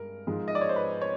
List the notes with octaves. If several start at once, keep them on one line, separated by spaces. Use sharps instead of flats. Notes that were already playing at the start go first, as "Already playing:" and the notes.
Already playing: G2 G#3 A#4
G#2 F3 G#3
D#5
D5
C#5
C5
B4
C#5